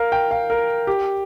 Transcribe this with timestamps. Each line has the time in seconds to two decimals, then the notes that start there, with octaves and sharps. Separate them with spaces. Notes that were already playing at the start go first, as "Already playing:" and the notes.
Already playing: A#4 F5
0.12 G5
0.31 F5
0.50 A#4
0.87 G4